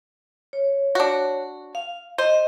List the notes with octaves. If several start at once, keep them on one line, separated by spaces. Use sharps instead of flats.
C#5
D4 F#4
F5
C5 D#5